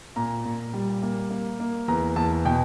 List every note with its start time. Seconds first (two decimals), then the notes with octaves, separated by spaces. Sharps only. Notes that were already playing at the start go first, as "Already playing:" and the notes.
0.16 A#2 A#5
0.45 A#2
0.73 G3
1.02 A#3
1.30 A#3
1.60 A#3
1.88 E2 A#5
2.16 E2 A5
2.45 B2 G5